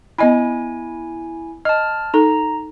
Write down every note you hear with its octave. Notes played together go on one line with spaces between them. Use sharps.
B3 E4 D#5 G#5 B5
D#5 A5 F6
D#4 A4 A#5